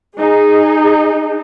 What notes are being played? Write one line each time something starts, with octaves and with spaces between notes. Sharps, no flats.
D#4 G#4